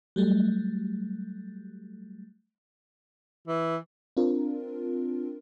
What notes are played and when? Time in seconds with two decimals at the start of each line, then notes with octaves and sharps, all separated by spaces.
0.16 F#3 G3 A3
3.48 E3
4.17 C4 D4 F4 A#4